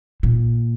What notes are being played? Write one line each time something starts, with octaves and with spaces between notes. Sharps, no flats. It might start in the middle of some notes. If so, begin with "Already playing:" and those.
A#2